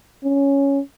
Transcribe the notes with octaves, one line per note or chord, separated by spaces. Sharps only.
C#4